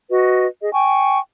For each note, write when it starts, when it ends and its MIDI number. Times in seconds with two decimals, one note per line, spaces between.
0.10 0.46 66
0.10 0.46 71
0.10 0.46 75
0.61 0.72 68
0.61 0.72 75
0.73 1.18 79
0.73 1.18 80
0.73 1.18 85